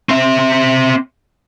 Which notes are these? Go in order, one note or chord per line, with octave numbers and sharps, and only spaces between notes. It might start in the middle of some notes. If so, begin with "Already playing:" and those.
C4 E5